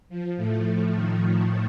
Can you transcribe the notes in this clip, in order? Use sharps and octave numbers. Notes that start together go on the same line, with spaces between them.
F3
A2 A3
F3
D#3
F3